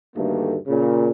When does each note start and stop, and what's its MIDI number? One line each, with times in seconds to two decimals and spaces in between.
0.16 0.56 38
0.16 0.56 43
0.16 0.56 51
0.16 0.56 57
0.16 0.56 58
0.68 1.10 46
0.68 1.10 49